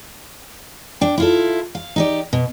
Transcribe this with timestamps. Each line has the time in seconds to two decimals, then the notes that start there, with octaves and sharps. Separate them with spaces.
1.01 D4 G5
1.18 E4 F4 A4
1.75 F5
1.96 D#4 G4 D5
2.33 B2